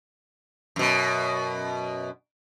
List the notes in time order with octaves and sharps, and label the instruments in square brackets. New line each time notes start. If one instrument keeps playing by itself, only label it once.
[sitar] F#2 B2